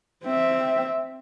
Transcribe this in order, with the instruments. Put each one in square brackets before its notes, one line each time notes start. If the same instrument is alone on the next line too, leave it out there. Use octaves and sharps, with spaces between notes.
[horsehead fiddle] C4 E5